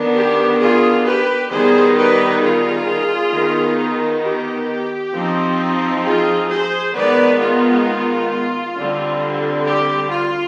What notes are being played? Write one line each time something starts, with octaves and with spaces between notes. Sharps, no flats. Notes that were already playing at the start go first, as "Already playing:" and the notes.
Already playing: D#3 B3 D4
G4
F4 G#4
G4 B4
D#3 G3 B3 D#4 G#4 C5
G4 B4
F4 G#4
D#3 B3 D#4
G4
F3 C4 D#4
F4 G#4
G#4 C5
D#3 G#3 B3 D#4 B4 D5
F4
D3 G3 C4
G4
F4